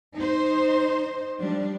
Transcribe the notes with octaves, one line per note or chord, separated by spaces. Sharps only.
D#4 C5
F3 G3 D4